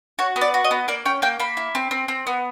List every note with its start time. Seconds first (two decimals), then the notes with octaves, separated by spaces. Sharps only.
0.19 F#4 C#5
0.36 B3
0.41 D5
0.54 F#4
0.64 D#5
0.71 B3
0.88 A#3 D5
1.05 C#4 G5
1.22 A#3 G5
1.39 A#3 B5
1.57 E4
1.75 C4
1.91 C4
2.08 C4
2.27 B3